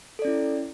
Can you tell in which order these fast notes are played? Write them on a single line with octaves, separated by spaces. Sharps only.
A4 D5 C#4 E4